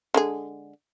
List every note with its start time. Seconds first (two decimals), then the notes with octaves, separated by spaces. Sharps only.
0.14 D3 G#3 G#4